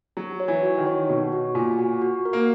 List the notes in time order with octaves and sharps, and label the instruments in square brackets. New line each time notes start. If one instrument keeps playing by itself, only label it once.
[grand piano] F#3 [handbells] F#4
[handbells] C#5
[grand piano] E3
[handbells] F#4
[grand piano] D#3
[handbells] C#5
[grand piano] B2 [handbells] F#4
[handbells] F#4
[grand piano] A#2 [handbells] G#5
[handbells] F#4
F#4
A#4
[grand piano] A#3